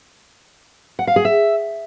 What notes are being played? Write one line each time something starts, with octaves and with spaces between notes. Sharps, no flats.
F#5
F5
G#4
E5